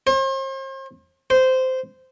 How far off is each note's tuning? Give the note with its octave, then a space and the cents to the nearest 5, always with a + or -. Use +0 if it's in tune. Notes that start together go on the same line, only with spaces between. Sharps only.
C5 +40
C5 -15